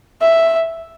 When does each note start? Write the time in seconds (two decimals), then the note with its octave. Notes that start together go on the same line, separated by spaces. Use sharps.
0.21 E5